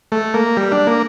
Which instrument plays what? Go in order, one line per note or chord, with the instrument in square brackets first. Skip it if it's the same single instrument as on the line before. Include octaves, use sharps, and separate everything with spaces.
[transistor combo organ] A3
A#3
G3
D4
A#3